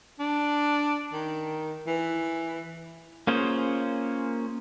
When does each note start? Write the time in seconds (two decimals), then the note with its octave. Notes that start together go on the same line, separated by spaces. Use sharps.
0.20 D4
1.13 D#3
1.87 E3
3.27 A#3 C#4 F4 G#4 C5